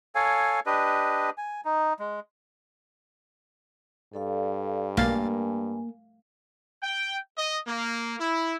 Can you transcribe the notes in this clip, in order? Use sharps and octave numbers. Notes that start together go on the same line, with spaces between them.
A4 C#5 F5 G#5
D4 G4 B4 D#5
G#5
D#4
G#3
G2 A4 D5 F5
B1 A#3 F5 G#5 A6
G5
D#5
A#3
E4